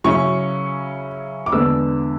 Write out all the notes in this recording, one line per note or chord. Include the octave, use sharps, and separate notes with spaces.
C#3 F#3 C#4 E4 C#6
D6
E2 D3 G#3 B3 D4 E6